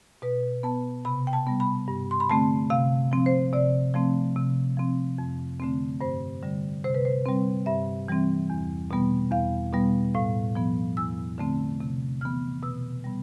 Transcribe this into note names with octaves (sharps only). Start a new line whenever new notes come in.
B2 B4
B3 A5
C3 B5
G5
A5
G3 B3
B5
G2
C6
B5
D3 A3 C4 A5
C3 F5
F3 C4
C5
C3 D5
F3 A3 C4
C3
F3 C4
F2
D3 A3 C4
G2 C5
D3 G3
C3 C5
B4
C5
G3 C4
G2 E5
E3 G3 C4
E2
B2 G3 B3
E2 F5
B2 G3 B3
A2 F5
F3 B3
E2 E6
D3 A3 C4
C3
E3 B3 F6
B2 E6
G3 B3